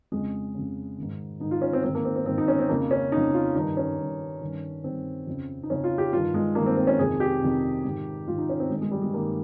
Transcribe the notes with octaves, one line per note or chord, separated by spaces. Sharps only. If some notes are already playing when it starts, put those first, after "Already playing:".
F2 C#3 G#3
F2 C#3
G#2 D#3
G#2 D#3 D#4
F4
C#4
C4
G#2 D#3 C4
A#3
C4
C4
G#2 D#3 C4
D#4
C#4
C4
F2 C#3 A#3
C#4
F2 C#3 D#4
F4
G2 D#3 D#4
C#4
G2 D#3
G2 D#3
G2 D#3 C4
F2 C#3
D#4
F2 C#3 C#4
F4
G4
G2 D#3 F4
G#3
G2 D#3 A#3
C4
C4
C#4
F2 C3 D#3 G#4
G4
F2 C3 D#3
G#2 D#3
G#2 D#3 F4
D#4
C#4
C4
G2 D#3 G#3
G#3
G3
G#3
G2 D#3 A#3